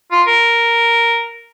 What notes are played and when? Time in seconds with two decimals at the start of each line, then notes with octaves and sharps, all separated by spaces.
0.12 F4
0.27 A#4